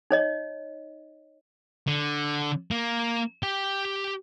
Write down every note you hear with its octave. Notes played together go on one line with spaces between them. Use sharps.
D#4 C#5 D#5
D3
A#3
G4 G5